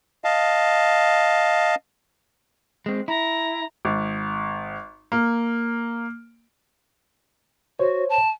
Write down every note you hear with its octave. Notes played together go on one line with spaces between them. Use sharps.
D#5 F5 A5
G#3 C4
E4 A#5
G#1
A#3
F#4 C5 C#5
A5